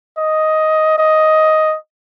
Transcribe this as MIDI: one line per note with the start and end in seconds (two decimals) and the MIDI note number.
0.17 0.95 75
0.98 1.76 75